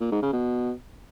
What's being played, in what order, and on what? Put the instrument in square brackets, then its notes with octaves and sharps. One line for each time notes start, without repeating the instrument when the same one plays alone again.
[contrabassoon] A#2
G#2
C#3
B2